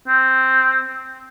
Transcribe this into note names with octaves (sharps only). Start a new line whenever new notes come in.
C4